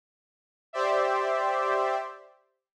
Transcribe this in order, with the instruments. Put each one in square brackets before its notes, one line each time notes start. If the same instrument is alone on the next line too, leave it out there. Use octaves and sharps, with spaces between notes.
[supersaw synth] G4 C5 D5 E5